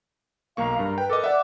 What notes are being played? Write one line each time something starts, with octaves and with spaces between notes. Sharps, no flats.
B1 A#3 F5 A#5 C#6
G2 A#4
B4 G5
A4 A#4 D#5 D6
D5 E5 F#5